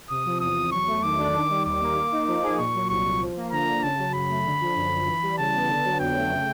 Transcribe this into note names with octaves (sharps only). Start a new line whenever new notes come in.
C3 D#6
F3
E2 D#6
E2
F#3 C#6
A3
D#3 D6
D4
D#3
G3
D#2 D6
A#3
A#3
D#4
F3
G#4
A#2 C#6
F#3
C2 C#6
C2
F3
A#3
D3 A#5
D3
C#3 A5
F#3
F#2 B5
A3
D3
F3
F#2
F#2
E3
G3
C#3 A5
B3
D3
F#3
F2 G5
A3
C#3